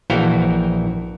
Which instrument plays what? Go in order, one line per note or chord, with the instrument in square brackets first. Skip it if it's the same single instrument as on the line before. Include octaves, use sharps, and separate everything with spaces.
[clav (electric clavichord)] A#1 E3 E4 F#4 F5 G5